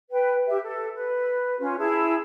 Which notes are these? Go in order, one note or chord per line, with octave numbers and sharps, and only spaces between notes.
B4 G5
G4 E5
A4
B4
C#4 F4
E4 G#4 A5